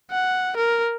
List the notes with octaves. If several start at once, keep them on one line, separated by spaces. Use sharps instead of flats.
F#5
A#4